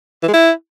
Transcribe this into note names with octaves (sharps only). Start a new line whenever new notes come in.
E3
G#3
E4